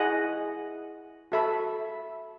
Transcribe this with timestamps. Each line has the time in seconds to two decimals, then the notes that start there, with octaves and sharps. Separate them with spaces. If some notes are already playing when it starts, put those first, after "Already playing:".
Already playing: E4 G#4 D#5 F#5
1.32 F#4 A4 E5 B5